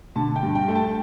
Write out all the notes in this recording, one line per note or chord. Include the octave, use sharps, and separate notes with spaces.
D3 A5
G5
G2
G5
A3 G5
A5